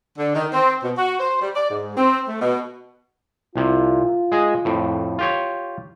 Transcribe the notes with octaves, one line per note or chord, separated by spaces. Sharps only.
D3
D#3
C4
B2
F#4
C5
G3
D5
G#2
C4
A3
B2
C2 C3 F4
G#3 G#4 D#5
F2 A2
F4 G4 C#5